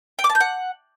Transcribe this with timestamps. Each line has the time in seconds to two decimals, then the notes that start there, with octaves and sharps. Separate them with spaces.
0.19 G5
0.24 D6
0.30 A5
0.35 G6
0.40 F#5